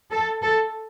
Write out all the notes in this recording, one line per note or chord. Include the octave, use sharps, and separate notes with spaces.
A4
A4